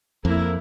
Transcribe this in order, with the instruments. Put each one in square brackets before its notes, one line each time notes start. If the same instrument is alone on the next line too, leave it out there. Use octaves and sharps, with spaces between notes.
[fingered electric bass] F2 [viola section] A#3 E4 A#4